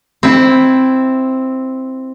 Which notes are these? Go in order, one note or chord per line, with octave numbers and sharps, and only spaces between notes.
C4 E4